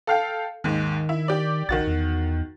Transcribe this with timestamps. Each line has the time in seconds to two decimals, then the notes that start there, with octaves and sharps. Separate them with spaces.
0.07 A4 F5 G5
0.64 D#2 G#2 D#3
1.09 E4
1.28 G4 D5
1.69 A#1 D#3 F#4 A6
1.87 E2